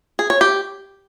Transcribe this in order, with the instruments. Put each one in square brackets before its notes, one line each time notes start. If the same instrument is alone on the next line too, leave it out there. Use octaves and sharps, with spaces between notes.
[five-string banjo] G#4
C#5
G4